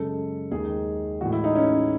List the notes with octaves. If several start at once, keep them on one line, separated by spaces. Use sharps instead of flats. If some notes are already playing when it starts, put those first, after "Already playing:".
Already playing: F#2 C#3 G#3 A4
D#2 D#3 G#3 G#4
A2 E3 G#3 F#4
E4
D#4
C#4